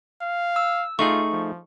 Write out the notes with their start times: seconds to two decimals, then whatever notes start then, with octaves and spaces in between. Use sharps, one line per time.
0.22 F5
0.56 E6
0.99 A3 D#4 F4 G#4 C#6
1.32 F3